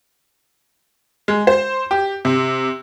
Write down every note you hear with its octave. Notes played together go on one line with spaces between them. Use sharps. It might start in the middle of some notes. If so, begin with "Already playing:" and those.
G#3
C5
G4
C3